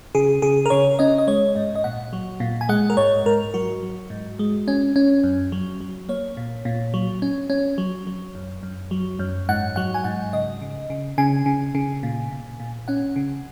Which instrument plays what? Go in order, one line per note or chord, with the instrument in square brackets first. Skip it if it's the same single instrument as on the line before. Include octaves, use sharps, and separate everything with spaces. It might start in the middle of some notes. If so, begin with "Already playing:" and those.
[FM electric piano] C#3 G#4
C#3 G#4
A#4
C#3 C#5
C#4 D#5
D#5
G#3 C#5
G#2 D#5
D#5
A#2 F#5
F#3
A#2
G#5
G#3 F#5
A#4
G#2 C#5
G#2 A#4
F#3 F#4
F#3
G#2
G#3
C#4
C#4
F#2
F#3
F#3
A#3 C#5
A#2
A#2
F#3
C#4
C#4
F#3
F#3
F#2
F#2
F#3
F#2
G#2 F#5
F#3 F#5
G#5
G#2 F#5
C#3 D#5
C#3
C#3
C#3 G#5
C#3
C#3
A#2
A#2
A#2
C#4 F#5
C#3